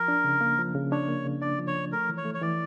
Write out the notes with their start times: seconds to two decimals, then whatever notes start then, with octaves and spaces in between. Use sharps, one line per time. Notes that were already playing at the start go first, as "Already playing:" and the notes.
Already playing: F3 A#4
0.08 D4
0.24 C#3
0.41 A#3
0.58 F3
0.74 C#3
0.92 D4 C#5
1.09 A#3
1.25 C#3
1.42 D4 D5
1.59 F3
1.67 C#5
1.76 F3
1.92 A3 A#4
2.09 E3
2.18 C#5
2.25 A3
2.35 C#5
2.42 E3 D5